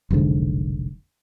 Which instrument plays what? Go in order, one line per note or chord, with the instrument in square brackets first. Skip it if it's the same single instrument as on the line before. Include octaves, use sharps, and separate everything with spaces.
[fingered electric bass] F1 B1 G#2 D3